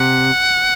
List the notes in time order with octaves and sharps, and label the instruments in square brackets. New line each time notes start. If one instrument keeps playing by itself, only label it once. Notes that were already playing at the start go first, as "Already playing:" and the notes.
Already playing: [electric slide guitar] C3 [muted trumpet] F#5